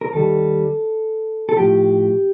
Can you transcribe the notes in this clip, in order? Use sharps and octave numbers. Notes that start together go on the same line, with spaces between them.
A#4
D#2 D#3 G3 A4
A4
A2 F3 G4